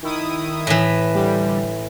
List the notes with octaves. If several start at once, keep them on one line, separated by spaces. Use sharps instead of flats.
D#3 E4 D#6
A2 E3
D3 G3